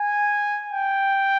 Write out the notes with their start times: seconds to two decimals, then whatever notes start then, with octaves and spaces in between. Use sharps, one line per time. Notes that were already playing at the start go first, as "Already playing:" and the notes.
Already playing: G#5
0.72 G5